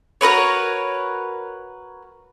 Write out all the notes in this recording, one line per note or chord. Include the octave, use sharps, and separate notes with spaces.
F#4 A#4 B4 C#5